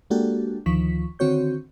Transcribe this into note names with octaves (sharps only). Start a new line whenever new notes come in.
G#3 A#3 D4 F#4 G4 A4
D2 D#3 F3 C#6 B6
D3 D#3 C4 F#4 C#5 G6